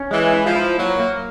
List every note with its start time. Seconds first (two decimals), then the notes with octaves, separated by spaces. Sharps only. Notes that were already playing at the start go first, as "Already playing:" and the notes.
Already playing: C#4
0.11 E3 G#3
0.33 E4
0.45 F3
0.56 E4
0.78 F#3 A#3
1.00 A#3